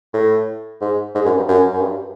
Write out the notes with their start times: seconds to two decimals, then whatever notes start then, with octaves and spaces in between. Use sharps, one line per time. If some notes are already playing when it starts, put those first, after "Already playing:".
0.14 A2
0.81 G#2
1.15 G#2
1.25 F#2
1.37 G2
1.49 F#2
1.73 F#2
1.81 G2